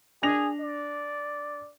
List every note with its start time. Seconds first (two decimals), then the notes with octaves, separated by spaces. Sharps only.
0.23 D4 G#4 A#6 F7
0.61 D5